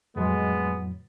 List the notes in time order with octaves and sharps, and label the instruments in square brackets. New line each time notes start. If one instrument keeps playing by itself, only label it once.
[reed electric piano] F2 A2 F#3 [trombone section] G#3 [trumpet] B3